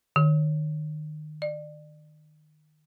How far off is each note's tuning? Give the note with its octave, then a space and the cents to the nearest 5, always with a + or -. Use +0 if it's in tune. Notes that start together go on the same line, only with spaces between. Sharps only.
D#3 -30
D5 +30